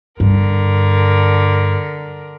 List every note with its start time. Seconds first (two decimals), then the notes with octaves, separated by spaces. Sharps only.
0.20 G2 D3 A#4